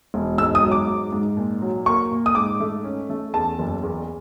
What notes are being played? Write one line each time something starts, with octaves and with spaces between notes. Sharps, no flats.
E1
G#2 E6
D#6
F#3
D6
G#2
G#2
A#2
F#3
A#3 C#6
A#2
D#6
G#2 D6
A3
C#4
A3
E2 A5
F#1
E2